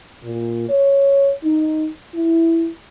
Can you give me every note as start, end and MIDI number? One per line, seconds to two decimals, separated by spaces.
0.24 0.68 46
0.69 1.31 73
1.44 1.89 63
2.15 2.68 64